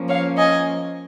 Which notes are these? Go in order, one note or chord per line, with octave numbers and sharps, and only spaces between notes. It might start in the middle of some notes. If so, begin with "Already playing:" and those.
Already playing: F3 A#3 C#4
C#5 F5
D#5 G#5